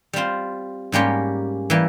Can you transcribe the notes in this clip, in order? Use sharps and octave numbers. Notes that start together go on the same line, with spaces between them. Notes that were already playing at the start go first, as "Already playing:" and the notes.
G3 C4 F4 C5
G#2 G3 A#3 C#4 G4
E3 G3 A#3